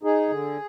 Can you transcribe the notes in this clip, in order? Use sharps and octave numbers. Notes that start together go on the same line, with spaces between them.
D#4 G#4
D3